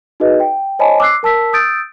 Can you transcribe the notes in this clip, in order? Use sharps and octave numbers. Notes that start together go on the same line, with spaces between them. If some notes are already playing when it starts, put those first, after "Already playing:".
D#4 F#4 G#4 B4 D#5
G5
C5 C#5 D#5 G#5 A5 B5
D6 E6 F#6 C7
A#4 A5 E6 B6
D#6 E6 G6 A6 D7